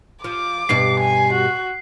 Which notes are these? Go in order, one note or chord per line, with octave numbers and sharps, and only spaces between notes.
F3 D6
G2 B2 D5 C7
G#5
F#4